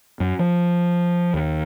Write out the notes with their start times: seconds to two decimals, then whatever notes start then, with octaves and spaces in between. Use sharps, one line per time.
0.20 F#2
0.39 F3
1.34 D#2